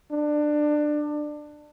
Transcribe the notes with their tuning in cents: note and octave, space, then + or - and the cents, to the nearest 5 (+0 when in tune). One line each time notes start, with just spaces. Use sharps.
D4 +20